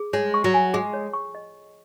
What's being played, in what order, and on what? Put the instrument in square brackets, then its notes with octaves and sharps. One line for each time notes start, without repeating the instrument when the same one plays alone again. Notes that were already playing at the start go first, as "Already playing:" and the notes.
Already playing: [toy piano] G#4
[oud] G#3 [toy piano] C#5
[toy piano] C#6
[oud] F#3
[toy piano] G#5
[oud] G#3 [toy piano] G#4
[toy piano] C#5
C#6
D#5